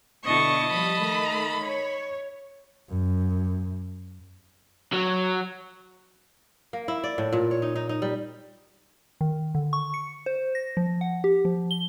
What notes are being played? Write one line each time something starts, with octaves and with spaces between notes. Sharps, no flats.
B2 D3 E4 D#5 A5 C#6
F3 G3 B5
D#3 A3
C#5
F#2
F#3
A#3
E4
D5
A2
A#2
C#5
D#4
D#4
D#4
G3
D#3
D3
C#6
C#7
C5
A#6
F3
F#5
G4
F3
G7